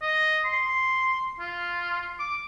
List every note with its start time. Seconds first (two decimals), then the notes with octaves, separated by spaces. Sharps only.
0.02 D#5
0.45 C6
1.40 F4
2.20 D6